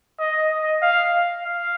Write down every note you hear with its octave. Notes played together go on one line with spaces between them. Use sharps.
D#5
D#5
F5
F5